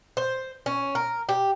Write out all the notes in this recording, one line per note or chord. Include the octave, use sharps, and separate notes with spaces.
C5
C#4
A#4
G4